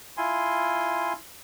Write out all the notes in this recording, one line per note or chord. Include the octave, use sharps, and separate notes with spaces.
E4 F4 G#5 C6